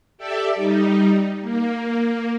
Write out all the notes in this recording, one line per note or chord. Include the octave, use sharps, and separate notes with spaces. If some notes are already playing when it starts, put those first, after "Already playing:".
G4 A4 D5 E5
G3 D#4
A#3